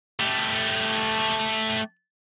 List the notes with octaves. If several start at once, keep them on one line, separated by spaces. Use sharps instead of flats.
A3 G4